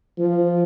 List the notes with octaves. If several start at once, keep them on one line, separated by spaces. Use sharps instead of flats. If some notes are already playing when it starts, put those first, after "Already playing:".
F3